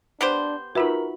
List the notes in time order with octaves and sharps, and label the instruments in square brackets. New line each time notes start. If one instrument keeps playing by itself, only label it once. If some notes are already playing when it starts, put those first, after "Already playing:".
[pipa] B3 G4 C5 [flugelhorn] D4
[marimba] D#4 F4 B4 [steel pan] F#4 E5 B5 [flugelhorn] A#4